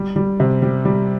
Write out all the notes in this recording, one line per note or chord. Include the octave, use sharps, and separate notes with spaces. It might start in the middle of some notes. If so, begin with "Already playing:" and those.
Already playing: G3
G3
C3
G3
G3